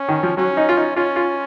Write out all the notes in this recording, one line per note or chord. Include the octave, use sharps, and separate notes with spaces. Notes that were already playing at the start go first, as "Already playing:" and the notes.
Already playing: C#4
D#3
F3
F#3 C#4
D#4
F4
D#4
C#4 F4
F4